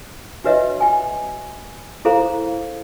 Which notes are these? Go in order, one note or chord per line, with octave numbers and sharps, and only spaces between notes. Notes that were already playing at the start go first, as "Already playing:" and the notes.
D4 F#4 B4 C#5 D#5 E5
G5 G#5
E4 G#4 A4 C5 F5 A#5